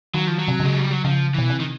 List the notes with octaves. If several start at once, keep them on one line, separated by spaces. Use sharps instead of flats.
D#3 F#3
F3
F#3
C3
C#3 G#3
G3
F#3
C#3 F3
B2 E3
C3
D#3